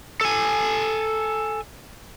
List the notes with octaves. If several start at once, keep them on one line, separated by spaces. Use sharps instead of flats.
A4 G#5